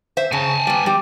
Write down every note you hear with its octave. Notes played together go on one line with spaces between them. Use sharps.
C5 E5
C#3 G#5 A5
G3 B3
G3 G4